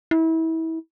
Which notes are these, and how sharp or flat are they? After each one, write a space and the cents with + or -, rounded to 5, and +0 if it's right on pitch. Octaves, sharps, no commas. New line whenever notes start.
E4 -30